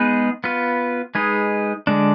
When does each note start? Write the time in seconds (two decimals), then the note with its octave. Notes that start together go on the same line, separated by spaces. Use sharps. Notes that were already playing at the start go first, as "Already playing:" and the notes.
Already playing: G#3 B3 D#4 G#4 B4
0.44 B3 F4 B4
1.15 G#3 D#4 G#4 B4
1.87 D3 G#3 D4